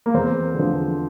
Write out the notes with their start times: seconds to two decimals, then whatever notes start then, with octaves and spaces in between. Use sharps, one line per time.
0.06 A#3
0.14 E2 C4
0.54 D3 F3